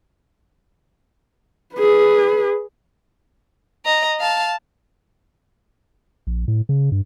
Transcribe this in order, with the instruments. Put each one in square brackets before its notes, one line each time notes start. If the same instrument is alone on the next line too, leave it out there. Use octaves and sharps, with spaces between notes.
[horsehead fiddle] G#4 B4
[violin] D#5 A#5
F5 A5
[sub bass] A#1
A2
C#3
G2